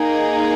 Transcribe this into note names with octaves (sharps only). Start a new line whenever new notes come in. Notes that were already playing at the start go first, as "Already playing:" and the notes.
Already playing: A#3 D#4 G#4